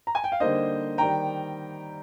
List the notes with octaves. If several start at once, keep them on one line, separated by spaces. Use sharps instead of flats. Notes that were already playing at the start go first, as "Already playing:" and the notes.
A#5
G#5
G5
F5
D3 G3 A#3 D#4 C5 D#5
D#3 G3 G5 A#5